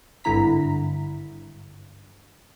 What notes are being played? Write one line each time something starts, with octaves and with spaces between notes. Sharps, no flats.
G#1 G2 D3 E4 A#5 B6